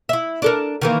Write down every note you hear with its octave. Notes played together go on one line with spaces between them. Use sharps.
E4 E5
D4 A4 A#4
D#3 E3 A#3